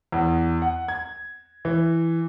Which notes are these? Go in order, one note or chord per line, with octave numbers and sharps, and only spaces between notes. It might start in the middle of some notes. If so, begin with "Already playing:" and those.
E2
F#5
G#6
E3